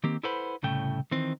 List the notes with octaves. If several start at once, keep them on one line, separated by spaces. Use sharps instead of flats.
D#3 A#3 C4 G4
E4 A4 B4 C5 F#5 B5
C2 A2 C#3 A3 G5
D#3 E3 C4